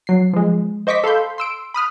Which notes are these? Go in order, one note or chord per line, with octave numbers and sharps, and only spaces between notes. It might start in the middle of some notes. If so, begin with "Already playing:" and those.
F#3 C7
F3 G#3
C5 D#5 C#6 D6 B6
A4 F5 B5 C6 G6
C6 E6 D7
B5 D#6 F6 F#6